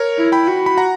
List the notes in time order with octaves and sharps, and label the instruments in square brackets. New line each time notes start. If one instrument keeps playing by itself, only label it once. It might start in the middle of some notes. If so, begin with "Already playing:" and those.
Already playing: [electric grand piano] A#4 C#5
[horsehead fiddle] E4
[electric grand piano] G5 B5
[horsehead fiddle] F#4
[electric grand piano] B5
F#5 A#5